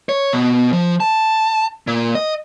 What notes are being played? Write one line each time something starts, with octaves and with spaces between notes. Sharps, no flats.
C#5
B2
F3
A5
A#2
D#5